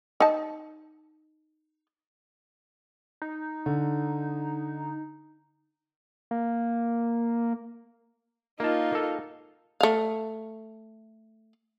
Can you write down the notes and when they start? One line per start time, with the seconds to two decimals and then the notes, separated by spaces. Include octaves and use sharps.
0.20 D#4 A5
3.22 D#4
3.66 D3
6.31 A#3
8.60 A#3 D#4 F4 A5
8.92 A#3 A4
9.81 A3 F5